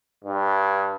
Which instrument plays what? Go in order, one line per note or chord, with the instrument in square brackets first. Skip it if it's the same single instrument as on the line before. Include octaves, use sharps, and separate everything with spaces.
[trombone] G2